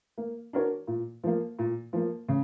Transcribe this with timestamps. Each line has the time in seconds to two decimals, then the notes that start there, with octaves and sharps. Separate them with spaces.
0.18 A#3
0.53 D4 F#4 A#4 C#5
0.87 A#2
1.23 F3 A#3
1.59 A#2
1.93 F3 A#3
2.28 C#3